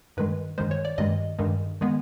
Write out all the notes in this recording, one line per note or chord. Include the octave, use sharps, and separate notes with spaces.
G2 D#3 G#3 B4
G2 D#3 G#3 C5
C#5
D5
G2 D#3 G#3 D#5
G2 D#3 G#3
D#3 G#3 B3